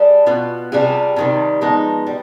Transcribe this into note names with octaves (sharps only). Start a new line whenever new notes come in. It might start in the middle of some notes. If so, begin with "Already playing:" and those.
Already playing: G3 D4 G#4
B2 B3 F4
C3 G3 D4 F4 G#4
C3 D#3 G3
F3 G#3 B3 D#4
G3